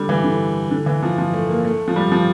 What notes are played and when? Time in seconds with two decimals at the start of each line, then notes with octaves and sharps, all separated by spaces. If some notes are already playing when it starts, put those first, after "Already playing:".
Already playing: D3 G3
0.09 E3
0.24 D3
0.71 D3
0.86 E3
1.03 F3
1.18 F3
1.34 A3
1.49 A#3
1.64 A3
1.88 F3
1.96 G3
2.12 F3